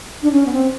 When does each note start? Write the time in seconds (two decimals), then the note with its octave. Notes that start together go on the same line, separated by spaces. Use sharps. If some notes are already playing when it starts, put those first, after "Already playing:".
0.23 D4
0.31 C#4
0.46 B3
0.52 C4